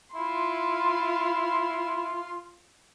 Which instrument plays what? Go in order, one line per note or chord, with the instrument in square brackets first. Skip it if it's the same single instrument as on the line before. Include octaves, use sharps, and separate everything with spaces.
[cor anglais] E4 [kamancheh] F4 C6